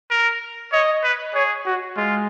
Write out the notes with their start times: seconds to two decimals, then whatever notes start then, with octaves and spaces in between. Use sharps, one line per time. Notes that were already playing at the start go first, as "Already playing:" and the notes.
0.10 A#4
0.72 C#5 D#5
1.04 B4
1.34 G#4 C#5
1.66 F#4
1.97 G#3 F4